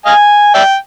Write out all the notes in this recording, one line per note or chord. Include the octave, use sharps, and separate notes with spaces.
D#5 F5 G#5
D5 E5 G5